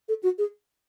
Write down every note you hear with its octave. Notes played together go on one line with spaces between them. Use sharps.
A4
F#4
G#4